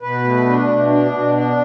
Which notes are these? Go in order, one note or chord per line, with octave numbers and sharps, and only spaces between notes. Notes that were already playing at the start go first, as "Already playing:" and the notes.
B2 B4
A3
D4
B2
D4
B2
D4